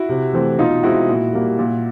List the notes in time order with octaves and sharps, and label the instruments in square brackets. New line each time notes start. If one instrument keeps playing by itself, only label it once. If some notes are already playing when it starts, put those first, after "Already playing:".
Already playing: [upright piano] E4 F#4
C3
E3 A3 C4
B2 D#4 F4
G#3 C4 E4 F#4
A#2
G3 A#3
A#2